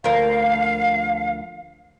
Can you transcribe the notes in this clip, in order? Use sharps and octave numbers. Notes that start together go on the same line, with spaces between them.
D2 F3 A#4 F5